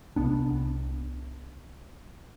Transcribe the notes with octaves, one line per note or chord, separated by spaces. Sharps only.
C2 B3 D4